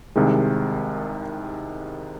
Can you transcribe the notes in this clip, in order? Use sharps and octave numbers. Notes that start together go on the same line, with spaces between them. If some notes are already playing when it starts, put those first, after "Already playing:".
C2 C3 D#3 G#3